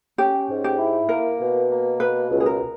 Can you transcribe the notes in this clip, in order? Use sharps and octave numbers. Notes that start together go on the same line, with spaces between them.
C#4 G4
G#2
G4
E4
A#3 A#4
B2
A#3
B2 B4
C#2
G#4
A#4